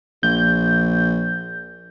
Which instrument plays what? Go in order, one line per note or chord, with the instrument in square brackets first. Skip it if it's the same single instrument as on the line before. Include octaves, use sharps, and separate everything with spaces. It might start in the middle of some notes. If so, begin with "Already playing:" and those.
[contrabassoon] A#1 [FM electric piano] G6